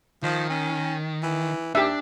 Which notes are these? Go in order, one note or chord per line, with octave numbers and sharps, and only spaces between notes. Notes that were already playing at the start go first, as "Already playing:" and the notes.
D#3 F3
C#4
E3
D#2 D4 G4 E5